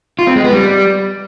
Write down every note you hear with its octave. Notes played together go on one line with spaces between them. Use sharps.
F4
C4
G#3
B3
G3